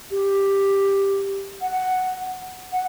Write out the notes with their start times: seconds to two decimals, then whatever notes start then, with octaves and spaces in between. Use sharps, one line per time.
0.11 G4
1.61 F#5
2.72 F#5